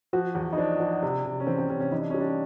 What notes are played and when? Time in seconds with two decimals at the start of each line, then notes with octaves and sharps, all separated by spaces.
0.13 F3 F#4
0.35 E2
0.53 D#4
0.58 F3 D4
0.80 F3
1.03 C3
1.25 C3
1.40 C#4
1.47 E3 C4
1.58 C4
1.70 C3 C#4
1.80 C#4
1.92 E3 D#4
2.01 D4
2.10 G3 C#4
2.19 D4